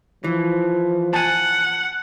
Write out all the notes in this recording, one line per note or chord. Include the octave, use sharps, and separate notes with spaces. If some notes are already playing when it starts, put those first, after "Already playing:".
E3 F3
F#5 G#5 A5